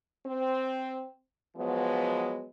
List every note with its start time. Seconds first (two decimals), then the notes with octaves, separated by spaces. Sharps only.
0.26 C4
1.56 F3 F#3 G#3 B3